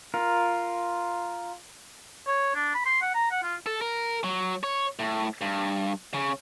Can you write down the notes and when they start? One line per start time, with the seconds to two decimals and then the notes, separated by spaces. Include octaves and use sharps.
0.14 F4 A#4
2.27 C#5
2.55 D4
2.74 B5
2.86 C6
3.02 F#5
3.14 A#5
3.31 F#5
3.43 F4
3.66 A4
3.81 A#4
4.24 F#3
4.63 C#5
4.99 A2
5.41 G2
6.14 C#3